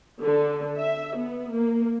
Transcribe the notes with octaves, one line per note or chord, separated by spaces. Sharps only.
D3
E5
B3
A#3